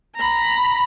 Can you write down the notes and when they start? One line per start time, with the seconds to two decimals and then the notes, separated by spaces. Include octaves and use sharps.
0.16 A#5 B5